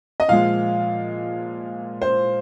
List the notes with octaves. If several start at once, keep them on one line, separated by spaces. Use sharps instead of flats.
D#5
A#2 F3 G#3 F5
C5